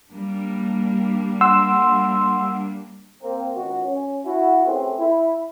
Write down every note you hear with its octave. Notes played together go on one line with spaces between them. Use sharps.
G3 A#3 D4
F#5 C6 E6
A#3 C4 A#4
C#2 D#3 F#4
C#4
E4 F#4
A3 C4 C#4 G4 G#4 B4
E4